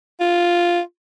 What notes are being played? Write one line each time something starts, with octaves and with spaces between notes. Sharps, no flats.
F4